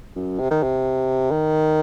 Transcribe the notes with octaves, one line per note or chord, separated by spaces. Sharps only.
F#2
C3
D#3
C3
D#3